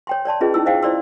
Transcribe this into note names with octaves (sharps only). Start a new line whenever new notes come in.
C#5 G5 C6
C#5 D5 A5 C6
C#4 F4 G#4 B4 D#5
C#4 D#4 E4 E6
C5 D#5 F5 G5
E4 C5 D5 C6 E6